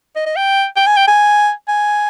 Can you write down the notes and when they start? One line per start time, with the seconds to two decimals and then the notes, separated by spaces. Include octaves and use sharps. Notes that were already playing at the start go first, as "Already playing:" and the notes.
0.16 D#5
0.26 D#5
0.36 G5
0.77 G5
0.87 G#5
0.97 G5
1.08 G#5
1.68 G#5